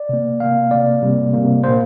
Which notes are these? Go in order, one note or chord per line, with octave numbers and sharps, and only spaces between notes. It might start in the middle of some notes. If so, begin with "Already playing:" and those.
Already playing: D5
C3 A#3
C3 A#3 F5
C3 A#3 D5
C3 G3 A#3
C3 G3 A#3
A#2 A#3 C5